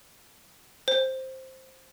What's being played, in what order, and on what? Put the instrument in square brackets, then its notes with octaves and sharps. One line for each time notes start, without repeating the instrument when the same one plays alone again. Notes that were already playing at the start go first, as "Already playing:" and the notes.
[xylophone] C5